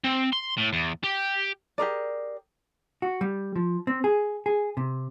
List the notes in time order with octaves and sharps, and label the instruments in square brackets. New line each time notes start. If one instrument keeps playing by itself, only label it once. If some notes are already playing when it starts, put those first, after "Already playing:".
[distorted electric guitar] C4
C6
A2
E2
G4
[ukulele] G4 G#4 A#4 D5
[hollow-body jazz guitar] F#4
G3
F3
C4
G#4
G#4
C3